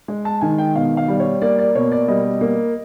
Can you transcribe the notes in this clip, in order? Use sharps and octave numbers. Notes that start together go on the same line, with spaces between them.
G#3
A5
D#3 G#5
G5
B2 F5
F5
G3
C#5
A#3 D5
D5
B2 C#5
D5
G3 D#5
A#3